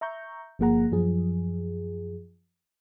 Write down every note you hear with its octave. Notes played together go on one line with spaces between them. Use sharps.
E5 A#5 C#6 G6
G1 F3 A#3 G#4 F#5 A#5
F#2 F3 G#4